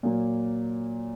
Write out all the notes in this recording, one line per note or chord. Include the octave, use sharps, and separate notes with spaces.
A#2 F#3 A#3